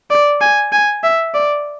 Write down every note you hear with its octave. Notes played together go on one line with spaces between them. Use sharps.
D5
G#5
G#5
E5
D5